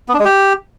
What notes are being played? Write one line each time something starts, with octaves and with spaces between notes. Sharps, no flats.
B3
D4
G#3
G4